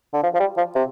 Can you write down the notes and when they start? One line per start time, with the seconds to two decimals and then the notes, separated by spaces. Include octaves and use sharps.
0.14 D3
0.23 F3
0.34 F3
0.40 G3
0.57 F3
0.75 C3